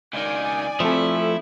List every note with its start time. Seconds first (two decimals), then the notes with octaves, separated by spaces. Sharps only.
0.14 C#2 D#3 D5 G#5
0.80 F3 A3 C4 E4 A4